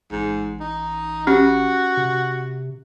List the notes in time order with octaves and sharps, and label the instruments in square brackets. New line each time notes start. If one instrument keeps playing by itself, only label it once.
[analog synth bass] A1 [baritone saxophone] G#2
[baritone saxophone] D#4
[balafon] C#4 G4 [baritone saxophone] F#4
[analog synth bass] C3